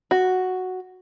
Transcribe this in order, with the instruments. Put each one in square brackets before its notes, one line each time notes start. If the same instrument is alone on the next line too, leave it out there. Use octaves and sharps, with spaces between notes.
[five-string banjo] F#4